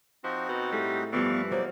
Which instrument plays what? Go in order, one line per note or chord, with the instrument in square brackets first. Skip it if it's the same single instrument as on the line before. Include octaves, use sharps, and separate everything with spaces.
[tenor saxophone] F3 [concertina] C4 D#4 F#4
[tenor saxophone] B2
[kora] A2 A3 G#4 [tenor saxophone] G3
[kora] G2 F3 G5 [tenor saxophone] E3 [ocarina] B3 [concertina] D5 F5 C#6
[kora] F#3 A#3 [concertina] D#4 D5 [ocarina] C5